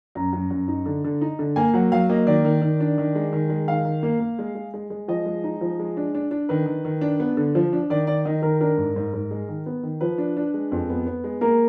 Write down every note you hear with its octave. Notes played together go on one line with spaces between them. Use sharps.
F#2 A#5
F#2
F#2
D#4
D3
D3
D#4
D3
A#3 G#5
F#3 F#5
F#3 F5
A#3 D#5
D#3 D5
D#3
D#3
D4
D#3
G#3
D#3
G#3
D#3 F5
D#3
A#3
A#3
G#3
G#3
G#3
G#3
F3 D#5
G#3
D#4
F3
G#3
D4
D4
D4
D#3 B4
D#3
D#3
D4
B3
D3
F3
D4
D#3 D5
D#3 D5
D#3 D#5
D#3 A#4
D4 A#4
G#2
G#2
G#2
G#3
D#3
B3
D#3
F3 B4
D4
D4
G#3
F2
B3
B3
G#3
A#3 A#4